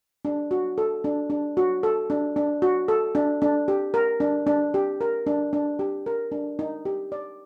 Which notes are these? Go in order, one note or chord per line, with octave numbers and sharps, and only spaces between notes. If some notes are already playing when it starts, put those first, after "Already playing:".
D4
F#4
A4
D4
D4
F#4
A4
D4
D4
F#4
A4
D4
D4
G4
A#4
D4
D4
G4
A#4
D4
D4
G4
A#4
D4
D#4
G4
D5